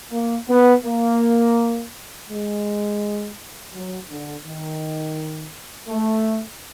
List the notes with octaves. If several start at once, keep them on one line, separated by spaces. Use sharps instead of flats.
A#3
B3
A#3
G#3
F#3
D3
D#3
A3